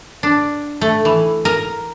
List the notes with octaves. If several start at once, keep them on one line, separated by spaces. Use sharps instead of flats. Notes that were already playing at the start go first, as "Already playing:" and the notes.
D4
A3
E3
A#4